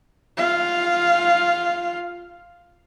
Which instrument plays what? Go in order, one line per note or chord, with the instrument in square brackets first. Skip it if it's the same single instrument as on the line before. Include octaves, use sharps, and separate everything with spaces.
[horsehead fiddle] F4 F5